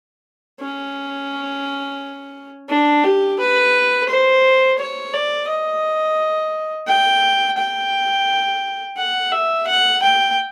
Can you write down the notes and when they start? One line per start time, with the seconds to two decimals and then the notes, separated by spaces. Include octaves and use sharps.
0.61 C#4
2.69 D4
3.04 G4
3.40 B4
4.09 C5
4.79 C#5
5.14 D5
5.49 D#5
6.88 G5
7.58 G5
8.97 F#5
9.32 E5
9.68 F#5
10.03 G5